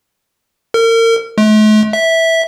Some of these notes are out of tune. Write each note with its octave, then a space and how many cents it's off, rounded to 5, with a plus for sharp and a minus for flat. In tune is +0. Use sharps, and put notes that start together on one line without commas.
A#4 -35
A3 -45
E5 -10